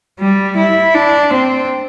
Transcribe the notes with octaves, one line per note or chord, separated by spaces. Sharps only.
G3
E4
D4
C4